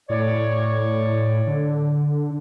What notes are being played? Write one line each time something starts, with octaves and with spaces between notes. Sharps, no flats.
A2 C#5 D5
D3